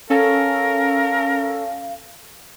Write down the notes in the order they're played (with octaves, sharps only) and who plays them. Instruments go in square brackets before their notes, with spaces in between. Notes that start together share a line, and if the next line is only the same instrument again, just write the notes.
[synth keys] C#4 A4 [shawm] A#4 [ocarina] F5